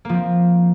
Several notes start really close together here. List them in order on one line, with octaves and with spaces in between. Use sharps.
A#3 F3 C4